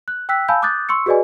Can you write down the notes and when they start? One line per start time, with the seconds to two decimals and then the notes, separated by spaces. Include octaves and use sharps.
0.08 F#6
0.29 G5 E6 F#6 B6
0.49 F5 G#5 A5 B5 E6 G6
0.62 D6 D#6 F#6 G6 A6
0.89 C6 C#6 E6 C#7
1.06 F#4 G#4 B4 D5 D#5 G#5